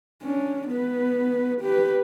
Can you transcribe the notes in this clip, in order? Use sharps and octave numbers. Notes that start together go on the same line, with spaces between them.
C#4 D4
B3 B4
G4 B4